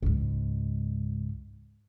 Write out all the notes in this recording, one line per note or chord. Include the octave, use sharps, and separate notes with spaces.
C#2 G#2